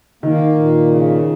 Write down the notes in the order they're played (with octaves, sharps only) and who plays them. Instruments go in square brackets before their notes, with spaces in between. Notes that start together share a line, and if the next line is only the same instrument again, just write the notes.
[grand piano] D#3 [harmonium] A#3
[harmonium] A#2
C#3